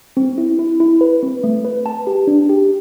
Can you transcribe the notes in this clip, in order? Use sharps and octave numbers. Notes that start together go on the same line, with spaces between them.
C4
E4
E4
E4
B4
C4
A3
B4
A5
G4
D4
G4